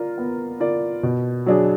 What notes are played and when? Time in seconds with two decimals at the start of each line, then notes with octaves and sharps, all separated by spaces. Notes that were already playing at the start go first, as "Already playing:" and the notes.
Already playing: F4 A#4 D5
0.18 B3
0.60 F4 A#4 D5
1.03 B2
1.46 F#3 D4 G#4